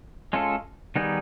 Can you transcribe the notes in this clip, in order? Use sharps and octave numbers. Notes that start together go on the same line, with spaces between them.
G#3 C#4 F4 A4
D#3 G3 B3 D#4 G#4